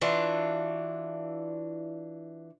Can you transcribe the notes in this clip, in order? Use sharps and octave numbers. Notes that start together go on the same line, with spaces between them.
E3 D4 F4 F#4